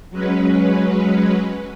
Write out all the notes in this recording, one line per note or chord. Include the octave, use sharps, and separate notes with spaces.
F#3 G#3 C#4 B4